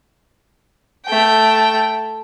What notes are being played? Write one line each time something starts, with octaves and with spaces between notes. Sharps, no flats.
A3 G5